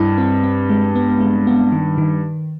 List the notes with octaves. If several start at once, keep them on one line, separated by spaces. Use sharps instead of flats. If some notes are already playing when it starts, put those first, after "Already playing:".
Already playing: G2 E4
C4
C4
G#3
B3
G#3
B3
D#3
D#3